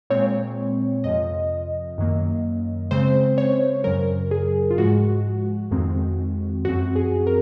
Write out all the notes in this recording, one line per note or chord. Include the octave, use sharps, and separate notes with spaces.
A#2 G#3 C4 C#5
F2 C3 F3 D#5
F#2 D#3 F#3 A#3
C#3 G#3 C4 C5
C#5
F#2 C#3 F#3 A#4
G#4
F4
G#2 F3 G#3 F#4
F2 D#3 G#3 C4
F#2 F3 C4 F#4
G#4
A#4